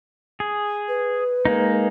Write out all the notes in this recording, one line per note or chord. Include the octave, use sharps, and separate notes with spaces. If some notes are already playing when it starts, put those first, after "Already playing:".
G#4
B4
G#3 A#3 D#4